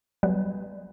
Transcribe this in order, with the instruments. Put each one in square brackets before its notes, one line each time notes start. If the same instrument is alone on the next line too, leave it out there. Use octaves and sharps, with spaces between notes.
[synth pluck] F#3 G3 B3 B4